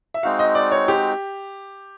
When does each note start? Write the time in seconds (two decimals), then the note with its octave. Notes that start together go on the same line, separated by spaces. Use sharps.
0.14 E5
0.23 G#3 C4 D#4 F#4 F5
0.39 D#5
0.55 D5
0.72 C#5
0.88 G4